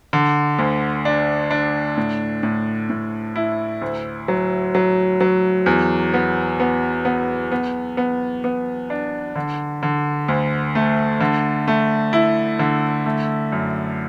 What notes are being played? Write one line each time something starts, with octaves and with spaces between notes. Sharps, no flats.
D3
D2
D4
D4
A2
A2
A2
E4
D2
F#3
F#3
F#3
E2
B3
B3
B3
B3
B3
B3
D4
D3
D3
D2
A3
D3
A3
E4
D3
A3
F#2